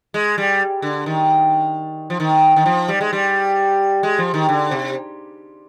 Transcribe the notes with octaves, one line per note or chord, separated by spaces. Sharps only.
G#3
G3
D3
D#3
F3
D#3
D#3
F3
G3
G#3
G3
G#3
F3
D#3
D3
C3